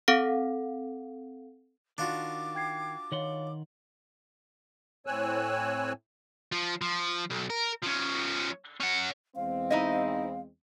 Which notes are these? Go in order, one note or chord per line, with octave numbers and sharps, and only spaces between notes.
C4 A4 F5 F#5
D#3 D4 F4 F#4 D6
G5 G#6 C7
D#3 C#5 F5 F#5 C6
A2 C4 C#5 G#5 E6 F#6
F3
F3
B1
A#4
F3 C#4
C#4 F#5
E2 G#3 C4 F5
D#4 E4 D#5